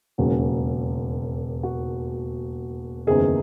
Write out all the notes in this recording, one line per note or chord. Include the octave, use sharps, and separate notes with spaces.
E1 D#2 C#3 F#3
F#4
F#1 E2 D#3 G#4